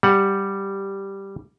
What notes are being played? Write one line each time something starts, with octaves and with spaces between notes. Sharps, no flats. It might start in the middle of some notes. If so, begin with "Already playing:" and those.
G3 F#5